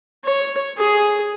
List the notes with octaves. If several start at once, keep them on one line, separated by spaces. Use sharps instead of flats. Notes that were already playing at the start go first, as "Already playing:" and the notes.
C#5
G#4